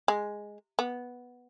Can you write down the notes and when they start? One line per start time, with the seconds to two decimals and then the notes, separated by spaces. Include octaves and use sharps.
0.08 G#3
0.79 B3